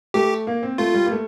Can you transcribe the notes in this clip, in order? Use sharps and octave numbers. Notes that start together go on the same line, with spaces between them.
A3 G4
A#3
C4
A3 F4
G3
A#3
A3